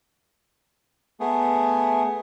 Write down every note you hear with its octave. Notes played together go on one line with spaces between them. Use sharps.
A3 B3 G#4